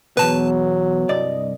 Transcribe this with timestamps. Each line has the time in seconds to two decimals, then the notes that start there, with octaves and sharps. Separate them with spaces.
0.17 E2 G#2 B2 F#3 B3 B4 A5
1.09 C2 G2 D5 D#5